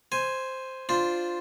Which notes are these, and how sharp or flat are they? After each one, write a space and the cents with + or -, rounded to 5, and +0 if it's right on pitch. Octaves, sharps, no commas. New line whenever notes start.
C5 +0 G#5 +0
D4 +0 F4 +0 C5 +0